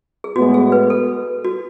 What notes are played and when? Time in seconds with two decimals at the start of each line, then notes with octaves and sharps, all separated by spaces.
0.24 G#4
0.36 A2 G#3 B3 F#4
0.54 G#4
0.72 B4
0.90 A4
1.44 F#4